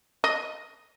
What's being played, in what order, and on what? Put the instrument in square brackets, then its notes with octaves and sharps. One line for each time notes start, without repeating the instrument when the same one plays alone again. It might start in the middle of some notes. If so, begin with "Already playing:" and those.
[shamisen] D#5